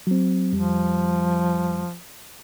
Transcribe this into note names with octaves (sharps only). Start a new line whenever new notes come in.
F#3 C4
F2 F3 G3